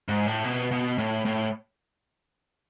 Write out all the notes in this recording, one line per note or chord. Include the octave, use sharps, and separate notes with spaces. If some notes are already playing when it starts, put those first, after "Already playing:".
G#2
A2
B2
B2
A2
A2